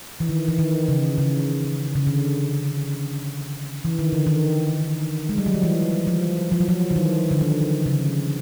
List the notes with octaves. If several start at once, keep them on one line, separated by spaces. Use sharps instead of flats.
E3
D#3
E3
D#3
C#3
C#3
C#3
D3
E3
D#3
D3
D#3
G#3
G3
F#3
F3
E3
F3
F3
F#3
F3
D#3
E3
D3
D#3
C#3